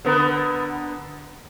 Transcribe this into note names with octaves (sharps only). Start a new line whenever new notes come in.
D3 B3 A#4